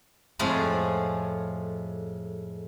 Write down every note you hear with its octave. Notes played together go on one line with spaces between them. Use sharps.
F2 A2 F3 G#3 G#4 G#5